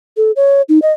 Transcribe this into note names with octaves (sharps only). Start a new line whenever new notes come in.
A4
C#5
D#4
D#5